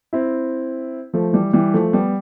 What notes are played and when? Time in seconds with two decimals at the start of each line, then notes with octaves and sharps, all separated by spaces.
0.13 C4 E4
1.14 F3 A3
1.33 E3 G3
1.53 E3 G3
1.74 F3 A3
1.93 G3 B3